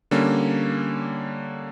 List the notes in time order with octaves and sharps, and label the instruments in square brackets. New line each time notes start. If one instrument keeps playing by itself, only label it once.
[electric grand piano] D3 G3 A#3 C#4